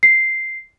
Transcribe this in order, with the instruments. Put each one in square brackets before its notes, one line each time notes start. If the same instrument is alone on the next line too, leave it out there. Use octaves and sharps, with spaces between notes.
[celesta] C7